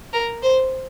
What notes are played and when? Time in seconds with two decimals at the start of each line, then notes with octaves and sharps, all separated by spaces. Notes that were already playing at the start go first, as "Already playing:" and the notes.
0.13 A#4
0.42 C5